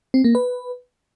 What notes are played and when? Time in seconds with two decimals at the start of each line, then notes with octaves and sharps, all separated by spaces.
0.14 C4
0.24 A#3
0.35 B4